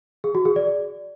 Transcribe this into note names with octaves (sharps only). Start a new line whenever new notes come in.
G#4
F#4
G#4
D5